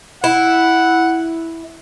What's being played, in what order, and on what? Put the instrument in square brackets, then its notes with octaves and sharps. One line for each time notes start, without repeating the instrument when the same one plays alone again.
[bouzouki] E4 [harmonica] F#5